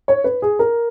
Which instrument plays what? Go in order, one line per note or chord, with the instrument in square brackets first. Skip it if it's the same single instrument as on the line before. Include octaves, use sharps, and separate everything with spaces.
[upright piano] C#5
B4
G#4
A#4